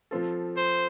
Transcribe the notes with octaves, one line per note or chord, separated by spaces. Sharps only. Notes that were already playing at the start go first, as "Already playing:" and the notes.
F3 C4 F4 A4
C5